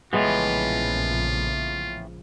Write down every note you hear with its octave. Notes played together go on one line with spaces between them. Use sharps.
A#1 A2 C#3 E3 F3 G#3 B3 F4